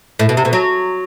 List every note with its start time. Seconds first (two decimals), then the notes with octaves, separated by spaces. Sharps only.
0.19 A2
0.29 B2
0.37 C3
0.45 B2
0.53 F#3